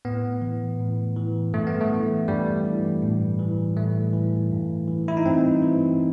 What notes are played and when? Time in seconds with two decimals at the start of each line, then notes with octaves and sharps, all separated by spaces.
0.05 A2 B3
0.42 E3
0.79 A2
1.16 E3
1.53 G2 A3
1.67 B3
1.81 A3
1.90 E3
2.28 G2 G3
2.65 E3
3.02 A2
3.39 E3
3.77 A2 A3
4.13 E3
4.51 G2
4.88 E3
5.08 E4
5.17 D#4
5.25 G2 C4
5.63 E3